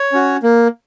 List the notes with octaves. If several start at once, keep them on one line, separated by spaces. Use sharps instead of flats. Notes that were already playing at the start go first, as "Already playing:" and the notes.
Already playing: C#5
C#4 F#4
A#3